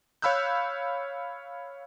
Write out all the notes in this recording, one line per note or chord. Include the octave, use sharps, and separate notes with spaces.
C#5 F5 B5 E6 F#6 G6